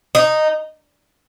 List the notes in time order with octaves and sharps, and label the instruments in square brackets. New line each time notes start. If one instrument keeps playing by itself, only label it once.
[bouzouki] D#4